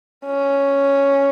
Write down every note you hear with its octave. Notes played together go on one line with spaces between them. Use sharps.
C#4